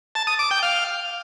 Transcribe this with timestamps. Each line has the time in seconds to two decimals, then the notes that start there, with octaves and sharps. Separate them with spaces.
0.15 A5
0.27 D#6
0.39 D6
0.51 G5
0.63 F5